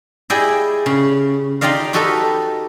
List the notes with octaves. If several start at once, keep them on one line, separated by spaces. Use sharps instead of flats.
E4 G4 G#4 D5 D#5 G5
C#3
D#4 F4 G4 D5 D#5 F5
D#4 F#4 G4 A4 B4 D#5